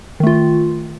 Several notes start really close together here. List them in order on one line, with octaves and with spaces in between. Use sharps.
D#3 A3 F4